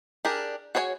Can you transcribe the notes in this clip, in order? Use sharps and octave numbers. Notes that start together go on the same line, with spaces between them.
D4 G4 G#4 A#4
F#4 G#4 C#5 D5 G#5